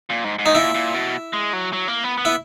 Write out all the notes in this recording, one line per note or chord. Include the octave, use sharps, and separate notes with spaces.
A#2
G#2
G#2
D#4
A#2 E4
A#2
B2
G#3
F#3
F#3
A#3
B3
B3
E4